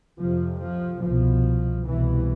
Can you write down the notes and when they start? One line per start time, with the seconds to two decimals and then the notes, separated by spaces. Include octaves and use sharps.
0.19 F2 C3 F3
0.61 F3
1.02 C2 B2 F3
1.86 C2 B2 E3